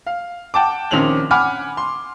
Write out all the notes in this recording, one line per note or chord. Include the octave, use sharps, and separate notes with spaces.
F5
F#5 G5 A5 D6
A#1 D#3 C4 C#4 F7 F#7
F#5 G#5 B5 D6 F6
C6